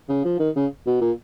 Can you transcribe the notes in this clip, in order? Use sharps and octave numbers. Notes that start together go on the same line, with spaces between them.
C#3
F3
D#3
C#3
B2
A#2